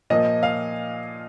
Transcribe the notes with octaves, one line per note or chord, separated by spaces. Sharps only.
A#2 F3 A#3 D#5
F5